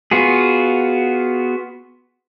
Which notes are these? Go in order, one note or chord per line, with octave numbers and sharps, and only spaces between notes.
B3 F4 F#4 G#4